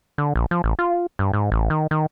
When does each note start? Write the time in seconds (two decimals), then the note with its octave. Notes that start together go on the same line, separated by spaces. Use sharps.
0.18 D3
0.36 A#1
0.51 F3
0.64 A1
0.79 F4
1.19 G2
1.33 G#2
1.52 A1
1.70 D#3
1.91 D#3